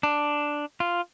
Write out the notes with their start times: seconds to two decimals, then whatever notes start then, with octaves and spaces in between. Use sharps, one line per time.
0.03 D4
0.80 F4